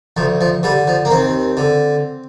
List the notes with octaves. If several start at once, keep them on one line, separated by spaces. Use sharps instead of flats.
D2 F3
F3
D3 G3
F3
A#3
D#2 C4
D3